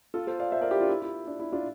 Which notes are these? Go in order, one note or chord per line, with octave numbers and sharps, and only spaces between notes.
F4 A4
A4 C5
D5 F5
C5 E5
A#4 D5
E4 G4
D4 F4
E4
E4
D4
E4
D4 F4